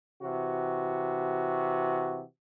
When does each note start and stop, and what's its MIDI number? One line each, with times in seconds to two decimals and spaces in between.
0.22 2.23 48
0.22 2.23 52
0.22 2.23 66